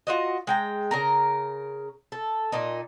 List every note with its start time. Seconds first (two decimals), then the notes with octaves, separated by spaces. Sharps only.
0.07 F4 F#4 D#5
0.47 G#3 G5 A#5
0.91 C#3 A#4 A#5
2.12 A4
2.52 A#2 D#4